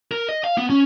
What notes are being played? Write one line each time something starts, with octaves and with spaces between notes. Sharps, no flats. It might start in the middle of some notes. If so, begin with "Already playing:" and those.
A#4
D#5
F5
B3
C#4